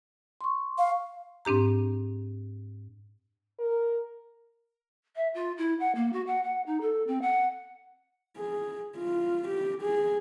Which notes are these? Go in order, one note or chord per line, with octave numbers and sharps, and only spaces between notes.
C6 C#6
F5
G#2 C4 D4 G4 A#5
A#4
E5
F4
E4
F#5
A#3
F#4
F#5
F#5
D#4
A4
C4
F#5
G#4
F4
G4
G#4